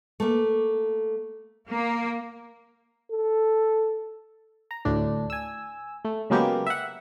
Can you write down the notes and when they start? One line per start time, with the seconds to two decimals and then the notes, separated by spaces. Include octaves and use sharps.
0.20 A3 A#3
1.68 A#3
3.11 A4
4.71 A#5
4.85 D2 A2 D4
5.30 G#5 E6
6.05 A3
6.30 C#3 F#3 G#3 A#3 B3 G4
6.67 E5 F#5